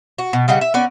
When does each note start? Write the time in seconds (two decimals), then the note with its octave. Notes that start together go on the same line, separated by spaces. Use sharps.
0.18 F#4
0.33 B2
0.48 C#3 G3 D#4 F#5
0.61 E5
0.74 B3 C#4 A#4 D5